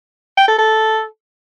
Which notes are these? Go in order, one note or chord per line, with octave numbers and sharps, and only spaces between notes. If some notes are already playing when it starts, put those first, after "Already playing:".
G5
A4
A4